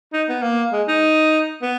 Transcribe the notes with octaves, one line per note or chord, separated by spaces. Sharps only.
D#4
B3
A#3
G#3
D#4
B3